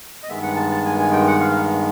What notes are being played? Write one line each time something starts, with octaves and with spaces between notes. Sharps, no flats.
D#5
G2 D#3 G#3 B3 E5
F#5
A5
A5
G#5
G#5
G5
F#5
F5